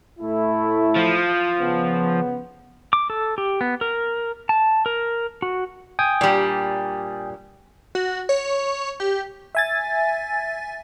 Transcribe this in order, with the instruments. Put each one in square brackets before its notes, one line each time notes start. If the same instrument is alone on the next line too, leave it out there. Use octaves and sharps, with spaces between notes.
[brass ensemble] A2 A3 E4
[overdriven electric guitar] F3
[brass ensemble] C#3 B3
[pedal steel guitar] D6
A4
G4
B3
A#4
A5
A#4
F#4
[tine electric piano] G5 G#5 D#6
[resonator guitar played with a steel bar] A#2 G3 [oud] D4 G4
[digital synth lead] F#4
C#5
G4
[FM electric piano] E5 G#5 A6